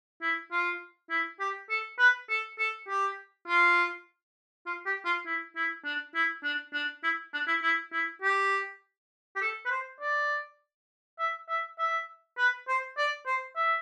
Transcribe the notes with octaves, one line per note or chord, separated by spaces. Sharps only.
E4
F4
E4
G4
A4
B4
A4
A4
G4
F4
F4
G4
F4
E4
E4
D4
E4
D4
D4
E4
D4
E4
E4
E4
G4
G4
A4
B4
C5
D5
E5
E5
E5
B4
C5
D5
C5
E5